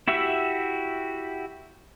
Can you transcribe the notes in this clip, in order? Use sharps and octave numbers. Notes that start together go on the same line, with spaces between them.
E4 F#4 G4 E5